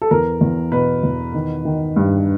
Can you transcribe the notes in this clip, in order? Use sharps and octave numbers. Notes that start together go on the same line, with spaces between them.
A4
E2 A#4
E2
B2 B4
E2
D#3
D#3
G2